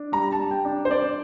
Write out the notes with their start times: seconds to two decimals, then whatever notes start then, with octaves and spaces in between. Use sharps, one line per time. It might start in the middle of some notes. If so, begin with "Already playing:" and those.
Already playing: D4
0.12 G3 A#5
0.32 A5
0.39 G3
0.51 G5
0.65 D4
0.85 C5
0.90 D4 D5